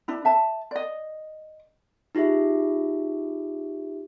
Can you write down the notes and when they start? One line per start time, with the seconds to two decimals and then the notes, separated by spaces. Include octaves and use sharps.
0.08 D4 E4
0.25 E5 A5
0.71 D5 D#5
2.15 D#4 F4 G4 G#4 E5